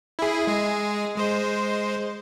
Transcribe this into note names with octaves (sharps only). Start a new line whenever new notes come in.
E4 G#4
G#3 G#4
G#3 C5